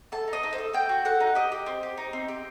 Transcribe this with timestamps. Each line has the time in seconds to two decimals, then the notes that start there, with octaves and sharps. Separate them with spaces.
0.12 A4 A5
0.28 D#4
0.33 D#5
0.43 D#4
0.53 C5
0.58 A4
0.73 A4 G5
0.89 F#4
1.05 A4 F#5
1.20 D#4
1.35 G4 D#5
1.52 G4
1.66 C4
1.83 G4
1.98 D#4
2.13 C4
2.28 G4